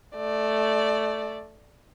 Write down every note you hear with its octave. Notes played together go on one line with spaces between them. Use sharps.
A3 D5